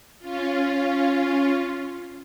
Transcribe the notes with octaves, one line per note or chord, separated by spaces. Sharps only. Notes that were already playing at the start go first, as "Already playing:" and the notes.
C#4 F4